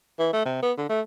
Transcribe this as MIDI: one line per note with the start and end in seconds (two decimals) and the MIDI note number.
0.19 0.31 52
0.33 0.44 57
0.45 0.58 48
0.63 0.72 59
0.77 0.85 50
0.89 1.01 57